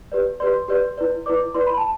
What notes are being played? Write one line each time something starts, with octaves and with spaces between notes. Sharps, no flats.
G4 B4 D5
G4 B4 D5 C6
G4 B4 D5
E4 B4 D5
E4 B4 D5 D6
E4 B4 D5 C6
B5
A5